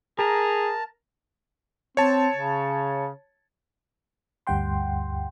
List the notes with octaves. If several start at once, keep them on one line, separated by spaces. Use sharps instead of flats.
G#4 A#4 A5 A#5
C4 C#5 A5
C#3
D2 G2 G3 F#5 G5 C6